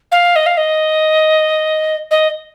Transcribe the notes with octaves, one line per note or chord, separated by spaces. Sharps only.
F5
D#5
F5
D#5
D#5